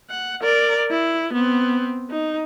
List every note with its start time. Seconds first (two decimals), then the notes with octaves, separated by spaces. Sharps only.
0.10 F#5
0.43 A#4 D5
0.90 E4
1.33 B3 C4
2.11 D#4